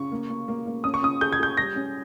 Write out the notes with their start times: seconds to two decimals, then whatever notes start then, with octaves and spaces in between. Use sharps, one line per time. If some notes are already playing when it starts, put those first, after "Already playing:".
Already playing: C#3 C#6
0.12 A#3
0.29 A#3
0.48 A#3
0.66 A#3
0.84 C#4 D#6
0.94 C#6
1.03 C#3 D#6
1.21 G#4 G6
1.32 G#6
1.39 G#4 G6
1.57 G3 A#6
1.76 C#4